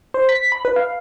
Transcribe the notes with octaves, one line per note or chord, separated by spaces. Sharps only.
C5
B6
B5
B4
F5